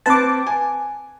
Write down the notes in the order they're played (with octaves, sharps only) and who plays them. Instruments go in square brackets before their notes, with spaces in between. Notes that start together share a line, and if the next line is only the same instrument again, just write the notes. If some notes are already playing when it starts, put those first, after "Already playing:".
[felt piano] C4 B4 [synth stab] A5 D6
[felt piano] G#5